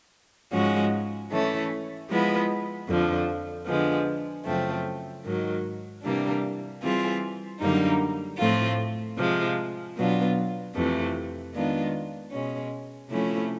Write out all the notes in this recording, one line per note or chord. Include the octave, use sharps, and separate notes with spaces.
G#2 F3 G#3 C#4 F#4
E3 A3 C#4
F3 G#3 B3 E4
F2 D3 F3
D3 F3 G#3 B3
F#2 C#3 F3 A3 C4
G#2 D#3 F#3
C3 E3 G3 A#3 D4
E3 G3 C4 F4 G#4
F#2 D3 G3 A#3 D#4
A2 F3 A3 C4 F4
C3 F3 G#3
B2 F#3 B3 D4 F4
F2 C3 E3 A3
D#3 G#3 B3 D4 F4
B2 G#3 C#4
C3 F3 A3 C#4 E4